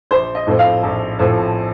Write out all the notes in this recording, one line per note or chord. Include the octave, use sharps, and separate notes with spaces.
A#1 C5
D#5
A2 F3 A3 C4
F5
A#1
A2 F3 A3 C4